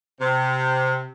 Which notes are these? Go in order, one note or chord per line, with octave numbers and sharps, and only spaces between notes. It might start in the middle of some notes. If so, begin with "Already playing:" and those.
C3